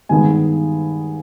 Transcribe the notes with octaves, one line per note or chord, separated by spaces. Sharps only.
G2 D#3 G#3 B3 G#5